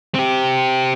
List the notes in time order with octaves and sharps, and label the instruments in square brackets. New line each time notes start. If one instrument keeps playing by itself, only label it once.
[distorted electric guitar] C4 G4